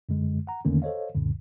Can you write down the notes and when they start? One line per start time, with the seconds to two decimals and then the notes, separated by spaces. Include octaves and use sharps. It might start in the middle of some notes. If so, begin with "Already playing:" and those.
0.09 F#2 D3 G#3
0.47 F#5 A#5
0.65 E2 D3 D#3 A3 A#3 C#4
0.82 A4 C5 C#5 D#5 F5
1.15 C#2 F#2 A#2 D3